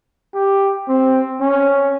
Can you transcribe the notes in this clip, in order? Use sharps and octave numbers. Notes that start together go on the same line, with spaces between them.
G4
C4
C#4